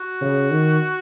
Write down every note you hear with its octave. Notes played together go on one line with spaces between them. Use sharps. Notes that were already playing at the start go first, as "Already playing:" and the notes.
Already playing: F#4
C#3
D#3